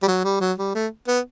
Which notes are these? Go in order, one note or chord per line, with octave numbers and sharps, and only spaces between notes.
G3
F#3
G3
F#3
G3
A3
B3